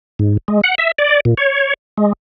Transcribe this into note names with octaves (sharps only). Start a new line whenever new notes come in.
G#2
G#3
F#5
E5
D5
A#2
C#5
G#3